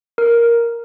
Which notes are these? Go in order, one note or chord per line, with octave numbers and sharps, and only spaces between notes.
A#4